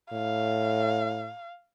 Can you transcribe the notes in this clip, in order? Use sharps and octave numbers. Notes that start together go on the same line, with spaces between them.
A2 F5